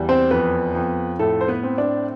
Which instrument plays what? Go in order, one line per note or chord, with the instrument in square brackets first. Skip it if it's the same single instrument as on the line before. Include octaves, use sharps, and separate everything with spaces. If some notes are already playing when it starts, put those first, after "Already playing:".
Already playing: [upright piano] E2 G3
C4 C5
F2 B3 B4
F2
A2 A3 A4
C5
B3 B4
C4
D4 D5